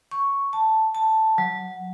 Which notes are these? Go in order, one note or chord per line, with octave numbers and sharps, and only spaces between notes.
C#6
A5
A5
F#3